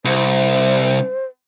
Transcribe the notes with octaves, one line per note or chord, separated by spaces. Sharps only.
C2 C5